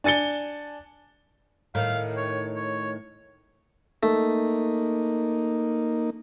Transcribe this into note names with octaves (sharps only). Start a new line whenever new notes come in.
D4 G#5 A6 C#7 G7
A2 D#3 F5
C#5
C#5
A3 A#3 D#4